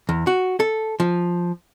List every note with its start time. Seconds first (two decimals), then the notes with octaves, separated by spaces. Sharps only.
0.09 E2
0.27 F#4
0.60 A4
1.00 F3